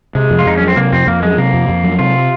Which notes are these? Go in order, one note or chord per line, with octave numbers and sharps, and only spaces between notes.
C3 G#3
F2
F4
F2 D#4
F#3 C#4
C4
C3 A#3
F2 C4
F2 A#3
F#3 G#3
C3 A#3
F2
F2
F#3
C3 F4